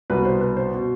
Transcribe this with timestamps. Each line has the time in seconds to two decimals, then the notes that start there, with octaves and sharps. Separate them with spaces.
0.10 C2 B2 B4
0.25 C5
0.41 B4
0.56 C5
0.74 B2